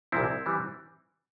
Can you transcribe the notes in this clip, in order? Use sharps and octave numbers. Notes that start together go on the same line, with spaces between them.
C2 A#2 F3 C4 E4
E3 G3